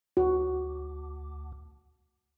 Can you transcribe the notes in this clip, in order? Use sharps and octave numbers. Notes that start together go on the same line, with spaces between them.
D2 F#4